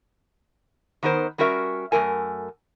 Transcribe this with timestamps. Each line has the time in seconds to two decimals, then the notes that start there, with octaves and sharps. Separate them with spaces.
1.03 D#3 B3 D#4 A#4 C5
1.38 G3 C#4 F#4 A#4 E5
1.92 F#2 C#3 A3 A#4 G#5